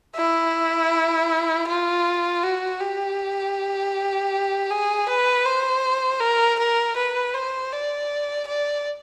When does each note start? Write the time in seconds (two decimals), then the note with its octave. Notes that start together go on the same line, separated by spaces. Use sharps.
0.16 E4
1.67 F4
2.43 F#4
2.81 G4
4.70 G#4
5.08 B4
5.46 C5
6.21 A#4
6.59 A#4
6.96 B4
7.34 C5
7.72 D5
8.48 D5